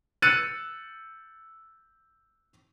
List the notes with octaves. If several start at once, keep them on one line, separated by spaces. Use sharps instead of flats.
E6 F#6 A6 C#7 D#7